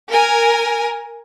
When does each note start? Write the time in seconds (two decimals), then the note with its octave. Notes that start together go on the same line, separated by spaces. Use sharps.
0.11 A#4 G#5